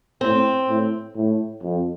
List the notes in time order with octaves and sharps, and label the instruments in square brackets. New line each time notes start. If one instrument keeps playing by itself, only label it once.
[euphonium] A2 [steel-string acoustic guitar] C4
[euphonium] A2
A2
F2